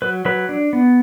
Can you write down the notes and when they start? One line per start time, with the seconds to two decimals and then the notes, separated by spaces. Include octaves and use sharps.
0.02 F#3 B4
0.25 F#3 B4
0.49 D4
0.73 B3